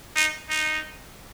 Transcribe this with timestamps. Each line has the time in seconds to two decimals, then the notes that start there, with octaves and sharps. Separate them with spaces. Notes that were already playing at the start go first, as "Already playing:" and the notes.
0.16 D#4
0.50 D#4